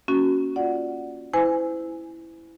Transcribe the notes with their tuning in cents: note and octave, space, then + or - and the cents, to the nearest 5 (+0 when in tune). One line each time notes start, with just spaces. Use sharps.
A#3 +0 C#4 +0 F#4 +0
F4 +0 D5 +0 F#5 +0
E4 +0 C5 -40 G#5 +0